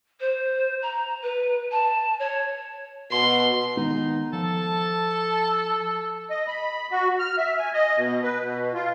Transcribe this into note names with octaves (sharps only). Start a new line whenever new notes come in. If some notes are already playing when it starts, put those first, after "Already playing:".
C5
A#5
B4
A5
C#5
B2 C6
D#3 G#3 B3 D#4
F3 A4 A5
D#5
B5
F#4
F6
E5
G#5
D#5
B2
B4
B2
F4